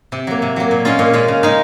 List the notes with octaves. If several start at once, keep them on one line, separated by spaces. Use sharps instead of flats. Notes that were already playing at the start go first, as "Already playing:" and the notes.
C3
F#3 A#3
C3
F#3 A#3
A#2
G#3 C#4 F4
A#2
G#3 C#4 F4
C#3
G#3 D#4